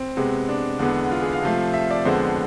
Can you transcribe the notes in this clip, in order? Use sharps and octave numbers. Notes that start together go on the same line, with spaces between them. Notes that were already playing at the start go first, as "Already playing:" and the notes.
Already playing: C4
C3 G#3 B3
D4
E2 D3 G#3 B3
F4
G#4
F5
C3 F3 A3 F5
E5
D5
F2 D3 G#3 B3 C5